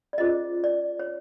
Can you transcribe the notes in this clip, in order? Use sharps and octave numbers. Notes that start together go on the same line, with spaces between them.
D5
C#4 F4 G#4 C5 D#5
D5
C#5